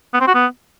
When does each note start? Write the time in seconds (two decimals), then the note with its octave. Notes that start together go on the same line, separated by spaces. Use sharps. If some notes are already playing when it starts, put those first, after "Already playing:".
0.13 B3
0.20 C4
0.27 F#4
0.34 B3